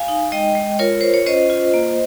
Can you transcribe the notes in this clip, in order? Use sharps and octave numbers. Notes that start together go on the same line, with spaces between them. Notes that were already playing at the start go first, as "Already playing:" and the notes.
Already playing: F5 G#5
D#4
G#3 D#5 G5
G#3
F4 A#4 C#5
F4 C5
C#5
C#4 C5 D#5
F4
A#3